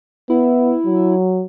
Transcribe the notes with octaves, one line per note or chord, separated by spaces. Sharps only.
B3 E4
F#3